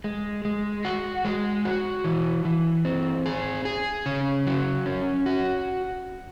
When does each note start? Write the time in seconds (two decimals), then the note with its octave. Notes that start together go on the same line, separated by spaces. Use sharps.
0.04 G#3
0.45 G#3
0.85 F#4
1.25 G#3
1.65 F#4
2.05 E3
2.45 E3
2.85 C4
3.26 G#4
3.65 G#4
4.06 C#3
4.46 F#3
4.86 C#4
5.26 F#4